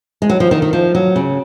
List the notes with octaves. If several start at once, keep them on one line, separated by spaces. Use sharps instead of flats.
G#3
F#3
F3
D#3
D#3
F3
F#3
C#3